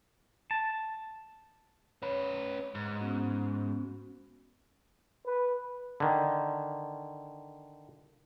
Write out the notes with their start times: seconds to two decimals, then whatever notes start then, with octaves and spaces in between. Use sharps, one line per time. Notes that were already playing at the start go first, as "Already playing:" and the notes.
0.51 A5
2.02 C#4 B4 C#5
2.75 G#2
3.00 B3 C#4 F#4
5.26 B4
6.00 D3 D#3